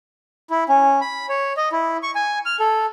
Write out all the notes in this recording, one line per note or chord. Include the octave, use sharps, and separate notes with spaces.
E4
C#4
B5
C#5
D#5
E4
C#6
G#5
F6
A4